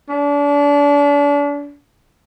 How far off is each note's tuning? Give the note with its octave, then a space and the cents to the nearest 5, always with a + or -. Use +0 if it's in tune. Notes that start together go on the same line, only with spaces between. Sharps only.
D4 -35